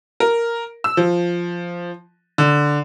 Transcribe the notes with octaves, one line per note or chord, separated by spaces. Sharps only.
A#4
E6
F3
D3